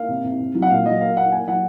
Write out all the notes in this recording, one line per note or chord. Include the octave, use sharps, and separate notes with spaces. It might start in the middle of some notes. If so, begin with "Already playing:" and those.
Already playing: A#3 F5
C3
C3
C3
F#3
F#5
A#2 F5
F#3 D#5
A#3 F5
A#3 F#5
A#3 G#5
F#3 F#5